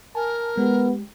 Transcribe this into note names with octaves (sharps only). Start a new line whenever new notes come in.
A#4 G#5 A5
G#3 B3 G4